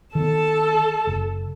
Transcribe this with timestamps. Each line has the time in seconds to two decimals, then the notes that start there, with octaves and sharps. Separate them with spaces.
0.15 D#3 B3 A4 A5
1.07 F#1